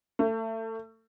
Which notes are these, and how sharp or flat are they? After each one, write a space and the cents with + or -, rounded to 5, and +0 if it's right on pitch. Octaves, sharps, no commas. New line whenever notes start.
A3 +30